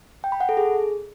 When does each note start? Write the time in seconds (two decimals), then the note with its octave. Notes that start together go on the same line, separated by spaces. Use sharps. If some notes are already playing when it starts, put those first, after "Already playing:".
0.24 G5
0.32 B5
0.40 F#5
0.49 A4
0.57 G#4